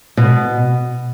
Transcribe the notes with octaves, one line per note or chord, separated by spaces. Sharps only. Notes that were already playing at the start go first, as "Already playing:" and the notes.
B2